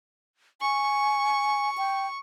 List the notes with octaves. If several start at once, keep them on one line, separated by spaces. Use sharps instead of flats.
G#5 C#6
G5